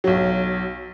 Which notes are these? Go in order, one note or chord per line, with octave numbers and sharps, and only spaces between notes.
B1 F#3